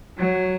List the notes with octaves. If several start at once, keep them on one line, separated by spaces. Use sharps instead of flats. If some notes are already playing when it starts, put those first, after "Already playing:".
F#3